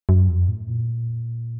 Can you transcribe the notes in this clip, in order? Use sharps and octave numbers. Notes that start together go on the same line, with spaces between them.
F#2
F2
A2
A#2